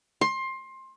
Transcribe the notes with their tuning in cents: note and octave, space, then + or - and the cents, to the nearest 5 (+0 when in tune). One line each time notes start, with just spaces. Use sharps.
C6 +20